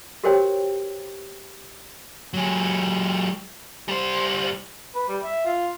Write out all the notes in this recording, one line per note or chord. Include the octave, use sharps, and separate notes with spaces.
F#4 G4 A#4 C5 C#5 G5
F#3 G#3
G3 C5
B4
G3
E5
F4